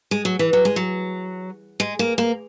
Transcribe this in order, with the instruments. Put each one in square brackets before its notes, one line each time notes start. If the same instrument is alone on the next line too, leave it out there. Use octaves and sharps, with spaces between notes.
[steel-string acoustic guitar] G#3
F#3
E3
F#3
G#3
F#3
G#3
A#3
A#3